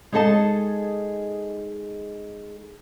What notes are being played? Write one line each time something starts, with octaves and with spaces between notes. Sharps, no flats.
G#3 D#4 G#4 A4 D#5 A5